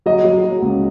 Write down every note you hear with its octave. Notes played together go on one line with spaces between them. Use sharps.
F#3 D#5
F#3
F#3
C#2